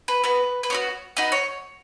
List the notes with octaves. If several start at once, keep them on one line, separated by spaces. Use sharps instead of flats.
B4
B3 F#4 B4
B4
B3 D#4 F#4 C#5
B3 D#4 F#4 B4
C#5